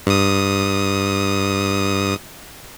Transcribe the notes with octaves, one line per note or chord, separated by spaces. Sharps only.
G2 D#6